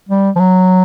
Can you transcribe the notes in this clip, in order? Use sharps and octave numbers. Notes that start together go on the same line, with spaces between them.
G3
F3
F#3